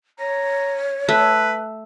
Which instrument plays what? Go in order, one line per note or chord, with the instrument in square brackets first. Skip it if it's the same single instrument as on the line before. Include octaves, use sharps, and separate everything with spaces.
[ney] C#5 [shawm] A#5
[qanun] A3 [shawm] B4